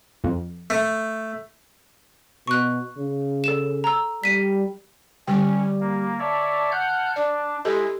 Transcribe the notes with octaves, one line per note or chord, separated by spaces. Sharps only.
F2
A3
B2 C#6 F#6
C#3
A4 E7
A#5 E6
G3 B6 D#7
D3 G3 C#4 G4 G5
A#3
C#5 D5 E5 A5
F#5 F6 G6
D4 D5
G#3 E4 G4 A4 D#5